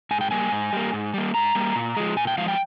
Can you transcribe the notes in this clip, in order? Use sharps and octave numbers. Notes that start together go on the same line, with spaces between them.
G#2 G#5
G5
G3 A#3 G#5
G#2
G3 A#3
G#2
G3 A#3
G#2 A#5
G3 A#3
A#2
F3 G#3
A#2 G#5
G5
F3 G#3 F5
G5